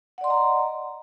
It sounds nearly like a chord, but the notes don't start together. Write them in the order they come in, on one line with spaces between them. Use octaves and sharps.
F#5 D5 C6 D#5 A#5